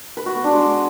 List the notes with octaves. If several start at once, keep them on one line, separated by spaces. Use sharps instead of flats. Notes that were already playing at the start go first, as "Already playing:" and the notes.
B4
F#4
B3
D4
G#3